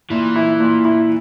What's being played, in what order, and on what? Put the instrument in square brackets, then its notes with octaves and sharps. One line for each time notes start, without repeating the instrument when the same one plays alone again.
[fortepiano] A#2 [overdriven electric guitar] E3
[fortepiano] E4
A#2
E4